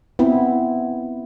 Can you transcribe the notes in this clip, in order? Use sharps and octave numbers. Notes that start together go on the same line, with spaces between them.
B3 C4 E4